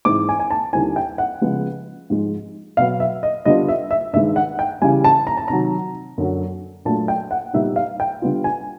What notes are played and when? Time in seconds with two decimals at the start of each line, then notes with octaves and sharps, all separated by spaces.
0.05 G#2 E3 G#3 C4 D6
0.29 G#5
0.40 G#5
0.50 A5
0.73 D#2 D3 G3 C4 E4 G#5
0.96 G5
1.18 F#5
1.41 C#3 F3 G#3 B3
2.10 G#2 F3 G#3
2.77 B2 F#3 B3 F5
3.00 E5
3.23 D#5
3.45 D3 G3 B3 D4 F4 D#5
3.68 E5
3.91 E5
4.13 G2 D#3 G#3 E5
4.36 F#5
4.59 G5
4.82 C#3 E3 G3 G#5
5.04 A5
5.27 A#5
5.37 A5
5.48 C3 D#3 F#3 A#5
6.18 F#2 D3 F#3
6.85 A#2 F#3 A3 D4 A5
7.08 G5
7.31 F#5
7.54 A#2 G3 B3 D#4 E5
7.76 F5
8.00 G5
8.22 D3 G3 B3 D4 F4
8.44 G#5